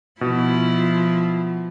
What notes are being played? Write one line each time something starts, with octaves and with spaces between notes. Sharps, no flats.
B2 F3 E4 F4